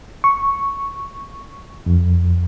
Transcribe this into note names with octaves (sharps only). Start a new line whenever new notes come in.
C#6
F2